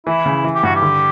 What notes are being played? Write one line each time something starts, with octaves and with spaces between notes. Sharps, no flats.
E3 E4
C#3
E3
G4
G2 F#4
G4
D3